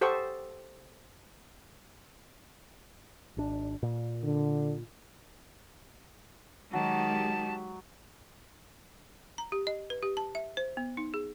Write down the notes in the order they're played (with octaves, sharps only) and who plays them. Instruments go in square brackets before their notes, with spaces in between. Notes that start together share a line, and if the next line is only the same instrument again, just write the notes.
[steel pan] G4 A4 C5 F#5 C#6 D#6
[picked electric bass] G#1 D4
A#2
[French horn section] D3
[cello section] D#3 G#3 G4 [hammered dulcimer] F#3 [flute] A5
[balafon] A#5
G4
D#5
B4
G4
A5
E5
C5
B3
D#4
G#4